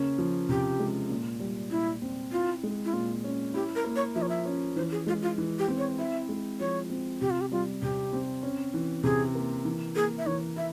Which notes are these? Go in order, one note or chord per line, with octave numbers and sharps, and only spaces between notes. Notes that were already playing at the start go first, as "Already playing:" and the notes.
Already playing: C#3 A#3 C#4
F3
C3 G4
G#3
A#2
G3
A#2 E4
C4
E4 F4
G#3
E4
A#2 F4
C#4
E4 G4
A#4
A#3
C#5
F3 E5
C#5
E5
C#4
E3 C5
G#4
G#3 F4
F4
E3
G4
C4
C#5
E4 E5
G#3
F3 C#5
C4
C3 G4
F4
G4
G3 F4
C3 G4
C4
C#4
E3
C3 G#4
A#3
E3
A#3 G#4
E5
E3 C#5
E4 E5